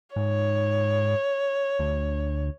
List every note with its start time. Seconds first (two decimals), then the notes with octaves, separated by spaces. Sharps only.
0.16 G#2 C#5
1.79 D2